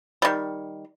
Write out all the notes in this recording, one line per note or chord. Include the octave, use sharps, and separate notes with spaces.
D#3 G3